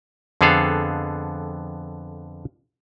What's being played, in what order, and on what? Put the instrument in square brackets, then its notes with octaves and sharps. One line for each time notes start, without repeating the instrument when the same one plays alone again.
[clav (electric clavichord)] F2 D3 B3 G#4 A4 F5